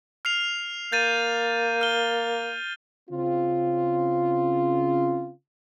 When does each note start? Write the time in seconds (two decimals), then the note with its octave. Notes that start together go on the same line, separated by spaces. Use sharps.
0.25 F6 C7 F7
0.92 A#3 G6 A6 D#7
1.81 F6 G7
3.10 C#3 C4 F4